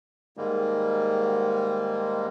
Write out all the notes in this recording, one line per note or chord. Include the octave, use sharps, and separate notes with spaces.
G#2 D#3 G3 G#3 A#3